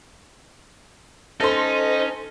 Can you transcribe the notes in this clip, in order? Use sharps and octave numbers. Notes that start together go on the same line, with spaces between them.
C#4 D#4 A4 C5 C6